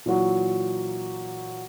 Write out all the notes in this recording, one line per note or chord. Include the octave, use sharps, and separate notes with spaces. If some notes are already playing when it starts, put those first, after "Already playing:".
A#2 E3 F#3 F#4